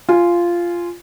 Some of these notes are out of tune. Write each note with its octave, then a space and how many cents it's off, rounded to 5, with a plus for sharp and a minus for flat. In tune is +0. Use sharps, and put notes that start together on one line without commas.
F4 -10 G#5 +0